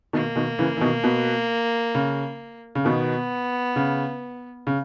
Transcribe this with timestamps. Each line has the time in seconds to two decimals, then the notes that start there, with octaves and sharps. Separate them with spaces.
0.13 B2 D#3 A#3
0.36 B2 D#3
0.59 C#3 E3
0.77 E3
0.81 B2 D#3
1.04 B2
1.95 C#3
2.75 C#3
2.85 B2 D#3 B3
3.76 C#3
4.67 C#3